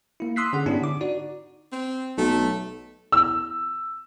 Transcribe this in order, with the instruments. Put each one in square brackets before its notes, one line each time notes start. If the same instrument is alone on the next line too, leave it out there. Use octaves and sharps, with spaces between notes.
[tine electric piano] A#3 E4
C6 D#6 E6 F#6 B6 C7
D3 C#4 G#4 F#5
G#2 B3 C#4 D4 E4 G4
D3 D6
D#4 F#4 D5
[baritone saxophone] C4
[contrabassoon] B1 [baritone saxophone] A3
[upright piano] E6